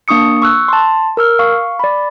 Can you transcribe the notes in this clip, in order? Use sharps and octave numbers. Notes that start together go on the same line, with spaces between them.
A#3 D4 C#6 D#6 C#7
C#6 E6 F#6
A5 C6
A#4 E6 F6
F5 C#6
D5 B5